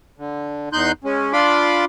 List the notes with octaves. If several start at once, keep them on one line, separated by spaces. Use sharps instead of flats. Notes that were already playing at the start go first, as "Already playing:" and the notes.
D3
E2 D#4 C6 F#6 G6
G#3 C#4
D4 F4 B5 C6 D6